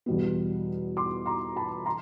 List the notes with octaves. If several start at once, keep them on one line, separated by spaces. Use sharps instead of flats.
E2 B2 G3 B3
C6 D6
A#5 C6
A5 B5
A#5 C6